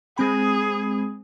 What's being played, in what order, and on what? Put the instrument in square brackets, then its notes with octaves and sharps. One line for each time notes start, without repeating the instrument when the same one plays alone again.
[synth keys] G#3 C4 B5 [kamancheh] G#4